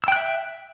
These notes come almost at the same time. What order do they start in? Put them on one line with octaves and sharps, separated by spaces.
E6 G5 F#6 E5